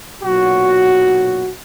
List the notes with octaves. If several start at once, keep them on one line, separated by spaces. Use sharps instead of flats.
B1 A#2 F#3 F#4